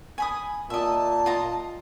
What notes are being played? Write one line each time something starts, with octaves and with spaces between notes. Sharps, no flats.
G#5 B5 D#6
A#2 D#5 E5 A5
F4 D#5 A#5